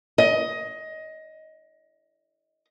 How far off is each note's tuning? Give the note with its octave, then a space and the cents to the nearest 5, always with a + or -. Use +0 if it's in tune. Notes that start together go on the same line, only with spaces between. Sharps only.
D#5 +15